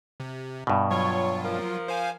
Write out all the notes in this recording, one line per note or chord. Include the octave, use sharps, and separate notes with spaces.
C3
G2 B2
F#3 F4 C#5
F3 A#4
C5 F5 G#5